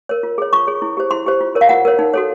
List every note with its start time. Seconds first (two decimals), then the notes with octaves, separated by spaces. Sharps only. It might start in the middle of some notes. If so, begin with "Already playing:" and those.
0.09 A#4 C#5
0.23 F4
0.38 G#4 C#5
0.53 F4 C#6
0.67 G#4 C#5
0.82 E4
0.97 G4 C5
1.11 E4 C6
1.26 G4 C5
1.41 F4
1.55 A#4 C#5
1.61 F5
1.69 F4 F#5
1.85 A#4 C#5
1.99 D#4
2.14 F#4 A4 C#5